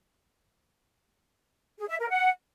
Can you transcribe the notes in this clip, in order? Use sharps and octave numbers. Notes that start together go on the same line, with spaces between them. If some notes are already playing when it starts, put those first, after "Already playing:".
G#4
E5
A#4
F#5